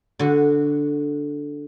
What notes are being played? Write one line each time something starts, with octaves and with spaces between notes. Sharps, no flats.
D3 F#4